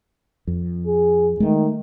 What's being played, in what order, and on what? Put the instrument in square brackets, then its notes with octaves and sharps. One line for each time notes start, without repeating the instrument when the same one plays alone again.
[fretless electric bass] F2
[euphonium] G#4
[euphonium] D#3 [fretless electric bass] G#3 A3